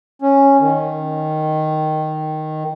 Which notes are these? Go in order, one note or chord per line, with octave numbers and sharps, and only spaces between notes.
C#4
D#3